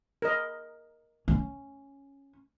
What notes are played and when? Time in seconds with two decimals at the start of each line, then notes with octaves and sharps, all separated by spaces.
0.22 A#4 D#5
1.28 C#4